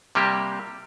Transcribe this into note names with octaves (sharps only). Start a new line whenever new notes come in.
C3 G3 A#3 G4